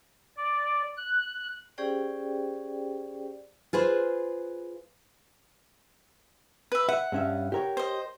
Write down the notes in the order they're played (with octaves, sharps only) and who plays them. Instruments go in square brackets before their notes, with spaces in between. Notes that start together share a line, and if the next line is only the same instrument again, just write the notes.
[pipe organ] D5
F#6
[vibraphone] C#4 G4 G#4 C5 D5 G5
[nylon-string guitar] F4 G#4 B4 C5
[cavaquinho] B4 E5
[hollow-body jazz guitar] E5 [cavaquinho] F#5
[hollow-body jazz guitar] G2 C#4 E5
G4 A#4 C#5
[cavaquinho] C5 D#5